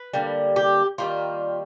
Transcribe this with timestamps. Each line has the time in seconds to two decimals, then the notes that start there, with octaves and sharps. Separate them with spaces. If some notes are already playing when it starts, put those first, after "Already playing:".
Already playing: B4
0.13 D3 G3 A#3
0.56 G4
0.98 D#3 G3 A#3 F4